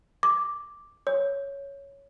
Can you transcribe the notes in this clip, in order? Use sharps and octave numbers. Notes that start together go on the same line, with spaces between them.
D6
C#5